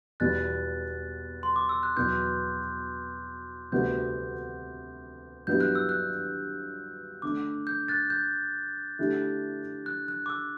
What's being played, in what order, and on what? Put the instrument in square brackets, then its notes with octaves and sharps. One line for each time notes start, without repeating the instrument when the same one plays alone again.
[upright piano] E2 B2 G3 [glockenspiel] F#6 A6
[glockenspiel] C6
D6
E6
F#6
[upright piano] E2 B2 F#3 B3 [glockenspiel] G6
[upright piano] D2 C3 G3 B3 F#4 [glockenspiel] G6
[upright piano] G2 F#3 B3 E4 G4 [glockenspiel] G6
[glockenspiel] F#6
E6
F#6
[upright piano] D3 A3 D4 [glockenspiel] D6
[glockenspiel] G6
F#6 A6
G6
[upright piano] D3 A3 E4 G4
[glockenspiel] F#6
F#6
D6
E6